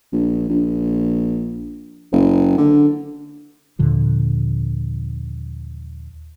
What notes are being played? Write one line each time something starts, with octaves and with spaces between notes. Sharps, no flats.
A#1
A#1
F#1
D3
D#2 A#2 D3 F3